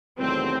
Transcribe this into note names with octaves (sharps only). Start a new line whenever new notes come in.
E2 C3 D#3 F#3 A3 C4